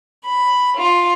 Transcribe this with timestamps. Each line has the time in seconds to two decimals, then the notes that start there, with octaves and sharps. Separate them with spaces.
0.24 B5
0.76 F4